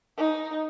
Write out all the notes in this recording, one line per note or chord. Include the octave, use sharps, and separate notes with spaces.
D#4